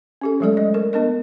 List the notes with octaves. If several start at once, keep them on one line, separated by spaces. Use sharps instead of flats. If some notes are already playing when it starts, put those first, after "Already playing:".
C#4 G4 A4
F3 F#3 G#3 A3 A4 D5
D#5
A#4
B3 D4 A#4 D#5